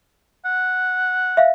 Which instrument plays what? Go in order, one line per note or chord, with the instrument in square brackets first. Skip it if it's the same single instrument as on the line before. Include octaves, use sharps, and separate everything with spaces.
[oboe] F#5
[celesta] E5 F5